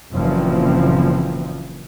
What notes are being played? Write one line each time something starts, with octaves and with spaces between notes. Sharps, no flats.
F#1 A#2 E3 F3 C4